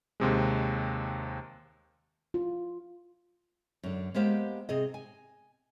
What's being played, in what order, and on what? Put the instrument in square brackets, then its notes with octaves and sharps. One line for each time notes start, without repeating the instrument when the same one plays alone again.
[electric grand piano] D#2 C3 G#3
[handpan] F4
[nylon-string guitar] F#2 D3
G#3 A#3 B3 G4 C5 F5
C3 G#4 D#5
G#5